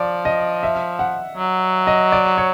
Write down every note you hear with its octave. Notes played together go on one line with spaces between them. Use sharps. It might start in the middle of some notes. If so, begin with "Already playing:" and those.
Already playing: F3 D5
D#5
E5
F#5
F#3
D#5
D5
C#5